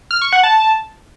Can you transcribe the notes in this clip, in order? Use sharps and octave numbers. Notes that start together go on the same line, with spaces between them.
F6
C#6
F#5
A5